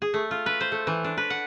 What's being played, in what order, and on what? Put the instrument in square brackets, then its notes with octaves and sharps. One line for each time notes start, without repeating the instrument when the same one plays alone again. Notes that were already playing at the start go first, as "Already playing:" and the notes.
[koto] G#4
A3
F4
B4
C5
A3
E3
D4
B4
F#5